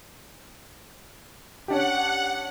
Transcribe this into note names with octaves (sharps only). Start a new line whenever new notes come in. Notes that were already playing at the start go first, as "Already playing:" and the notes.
C#4 D4 G4 F#5